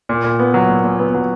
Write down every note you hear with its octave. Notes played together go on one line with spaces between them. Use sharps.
A#2
A#2
B3
F#3
A#2
A#2
B3
F#3